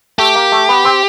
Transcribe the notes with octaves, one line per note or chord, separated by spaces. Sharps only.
A3 G4
A#3
A3
B3
C4